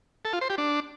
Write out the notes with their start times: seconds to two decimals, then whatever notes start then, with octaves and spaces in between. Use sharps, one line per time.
0.25 A4
0.33 F4
0.41 C5
0.50 G4
0.58 D4